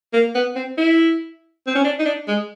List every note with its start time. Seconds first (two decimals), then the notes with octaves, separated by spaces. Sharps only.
0.13 A#3
0.35 B3
0.55 C4
0.78 E4
1.67 C4
1.75 C#4
1.84 D4
1.99 D#4
2.05 D4
2.28 G#3